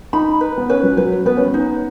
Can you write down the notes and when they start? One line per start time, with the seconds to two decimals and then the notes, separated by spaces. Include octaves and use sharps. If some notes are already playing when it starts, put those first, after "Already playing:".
0.13 D#4 B5
0.41 B4
0.58 B3
0.69 C#4 B4
0.83 F#3
0.97 F#3 B4
1.26 B3 B4
1.37 C#4
1.48 B3
1.54 D#4